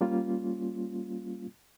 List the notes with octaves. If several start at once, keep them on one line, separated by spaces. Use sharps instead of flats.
G3 A#3 C#4 F4